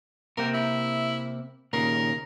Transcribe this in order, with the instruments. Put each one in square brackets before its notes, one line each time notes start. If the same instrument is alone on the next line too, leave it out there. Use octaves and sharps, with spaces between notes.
[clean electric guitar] C3 A#3 G5 [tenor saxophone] A#4
[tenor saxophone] E4
[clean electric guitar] D#2 A#2 C#3 [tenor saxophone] A#4